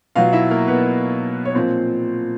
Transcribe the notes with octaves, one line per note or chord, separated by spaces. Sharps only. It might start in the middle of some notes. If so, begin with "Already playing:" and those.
B2 F#3 F4 F5
E4 E5
A#3 A#4
B3 B4
C#5
A#2 F3 C4 C5